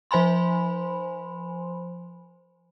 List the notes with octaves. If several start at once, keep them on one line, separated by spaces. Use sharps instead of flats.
F3 C5 G#5 B5 C6